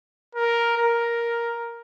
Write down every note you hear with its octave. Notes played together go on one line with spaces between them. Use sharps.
A#4
A#4